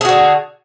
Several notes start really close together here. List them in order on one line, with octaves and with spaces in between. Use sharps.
G#4 F#4 D3